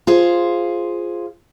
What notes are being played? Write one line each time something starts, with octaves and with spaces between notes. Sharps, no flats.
F4 G#4 C5